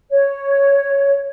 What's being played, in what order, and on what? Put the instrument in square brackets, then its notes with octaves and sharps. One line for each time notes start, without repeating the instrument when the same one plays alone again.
[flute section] C#5